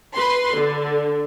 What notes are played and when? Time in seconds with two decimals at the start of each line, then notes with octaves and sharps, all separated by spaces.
0.15 B4 C6
0.55 D3